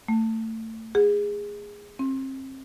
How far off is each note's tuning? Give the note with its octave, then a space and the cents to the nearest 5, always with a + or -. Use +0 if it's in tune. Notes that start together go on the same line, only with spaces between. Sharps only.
A3 +25
G#4 -20
C4 +30